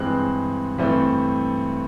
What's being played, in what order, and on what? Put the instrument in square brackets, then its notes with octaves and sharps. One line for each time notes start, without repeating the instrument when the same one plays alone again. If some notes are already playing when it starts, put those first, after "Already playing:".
Already playing: [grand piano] G2 E3 G#3 C4 F#6
G2 E3 A3 C4